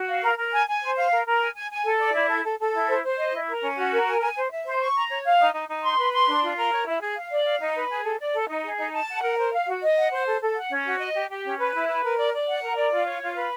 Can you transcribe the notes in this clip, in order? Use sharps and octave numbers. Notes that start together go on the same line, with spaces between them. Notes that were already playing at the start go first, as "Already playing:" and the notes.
Already playing: F#4
F5
A#4
A#4
G#5
G#5
C5
F5
A#4
A#4
G#5
G#5
G#5
A4
D5
E4
A4
A4
A4
E4
C5
C5
D#5
E4
A#4
C#4
F#4
A#4
G#5
G#5
C5
E5
C5
C#6
A#5
C#5
F5
D#4
D#4
D#4
C6
B4
C6
D4
F4
A#4
C#5
E4
G#4
F5
D5
F5
D#4
B4
G#4
A4
D5
A4
D#4
G#4
D#4
A5
F#5
A#4
C5
F5
F#4
D#5
F#5
C5
A4
A4
F#5
C#4
F#4
D#5
G4
G4
C#4
B4
E4
B4
A#4
D5
D5
F#5
A#4
D5
F4
C#5
F4
B4